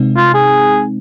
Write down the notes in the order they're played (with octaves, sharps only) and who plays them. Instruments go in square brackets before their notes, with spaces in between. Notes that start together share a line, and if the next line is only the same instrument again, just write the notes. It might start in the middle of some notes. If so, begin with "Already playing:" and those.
Already playing: [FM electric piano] C3 G#3 C4 D#4
[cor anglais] F4
G#4